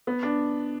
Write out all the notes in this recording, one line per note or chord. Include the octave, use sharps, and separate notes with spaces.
B3
D4